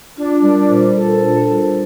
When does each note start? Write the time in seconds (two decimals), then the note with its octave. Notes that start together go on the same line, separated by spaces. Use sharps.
0.17 D4 F4
0.43 G3 A#4
0.68 A#2 C5
0.95 A4
1.21 D4
1.47 G3